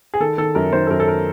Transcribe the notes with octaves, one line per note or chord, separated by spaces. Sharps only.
G#4
D#3 A4
D#3 A4
F#2 A#4
D#3 C5
A4
F#2 A#4
A4
A#4